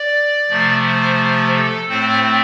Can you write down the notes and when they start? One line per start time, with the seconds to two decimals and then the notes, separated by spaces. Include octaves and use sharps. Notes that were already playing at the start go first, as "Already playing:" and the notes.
Already playing: D5
0.50 C3 F3 A3
0.86 C5
1.54 A4
1.89 A2 A3 C4 C5